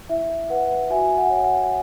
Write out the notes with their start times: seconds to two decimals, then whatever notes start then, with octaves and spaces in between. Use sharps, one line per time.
0.09 E4 E5
0.50 B4 F#5
0.90 F#4 E5 G#5
1.18 F#5
1.30 C#5
1.44 F#5